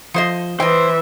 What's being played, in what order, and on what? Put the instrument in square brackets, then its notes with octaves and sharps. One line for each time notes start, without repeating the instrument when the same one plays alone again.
[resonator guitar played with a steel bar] F3 C5 D#5
[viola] E3 E5 [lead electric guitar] C5 [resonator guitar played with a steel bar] D#5 G5